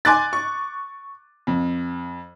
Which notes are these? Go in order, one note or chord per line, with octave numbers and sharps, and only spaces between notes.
G#5 C6 D6 F#6 A6
C#6
F2